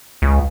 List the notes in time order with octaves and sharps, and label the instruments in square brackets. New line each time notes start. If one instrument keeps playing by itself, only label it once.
[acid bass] C#2